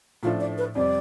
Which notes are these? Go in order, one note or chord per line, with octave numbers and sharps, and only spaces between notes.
A2 F3 A3 D4 F4
D5
B4
F2 C3 G3 C4 D5